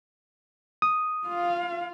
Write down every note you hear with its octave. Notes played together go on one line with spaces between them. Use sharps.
D#6
F4 F5